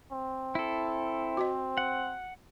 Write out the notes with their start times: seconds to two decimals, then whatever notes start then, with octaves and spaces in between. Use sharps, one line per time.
0.12 C4
0.55 E4 A4
1.37 F#4 C5 D#5
1.78 F#5